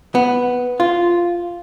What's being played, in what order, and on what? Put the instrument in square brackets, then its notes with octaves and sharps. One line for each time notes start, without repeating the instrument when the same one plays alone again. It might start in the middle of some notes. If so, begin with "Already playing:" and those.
[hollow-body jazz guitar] B3
F4